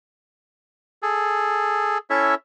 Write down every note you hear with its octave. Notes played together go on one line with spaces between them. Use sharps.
G#4 A4
C#4 E4 A4 C#5 E5